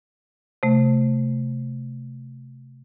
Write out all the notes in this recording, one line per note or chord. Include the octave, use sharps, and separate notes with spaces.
C3 A3